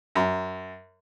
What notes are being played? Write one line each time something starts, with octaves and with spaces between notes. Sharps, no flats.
F#2